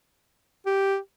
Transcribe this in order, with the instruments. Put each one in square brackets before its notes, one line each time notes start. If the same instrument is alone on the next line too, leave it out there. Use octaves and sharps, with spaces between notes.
[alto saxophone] G4